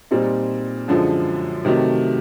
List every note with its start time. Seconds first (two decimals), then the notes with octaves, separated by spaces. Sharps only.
0.11 A#2 G3 C4 D#4
0.88 F#2 D3 F3 G#3
1.65 C3 D#3 F#3 A3